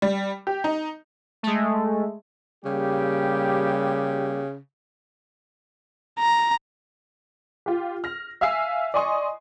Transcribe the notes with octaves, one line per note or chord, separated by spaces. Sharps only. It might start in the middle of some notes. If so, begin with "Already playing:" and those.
G3
G4
D#4
G#3 A3
C#3 G3 A#3 G4
A#5
F4 G4
F6 A#6
E5 F5 G#5 E6 C7
D5 D#5 G#5 C6 C#6 D#6